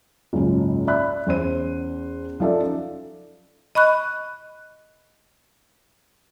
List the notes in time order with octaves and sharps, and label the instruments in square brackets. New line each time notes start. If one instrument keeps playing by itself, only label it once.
[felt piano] F#1 C#2 G#2 C#4 F4
D5 E5 B5 F#6
E2 C#4 C5 D#7
F3 C#4 D#4 A4 D5 E5
[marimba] D#5 B5 C#6 F#6